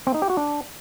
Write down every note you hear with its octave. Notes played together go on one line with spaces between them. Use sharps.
C4
D#4
G4
F#4
D4